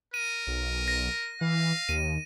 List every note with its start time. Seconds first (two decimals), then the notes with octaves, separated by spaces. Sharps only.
0.14 A#4 D#7
0.47 B1
0.88 A#6
1.41 E3 F5
1.89 D#2 D#7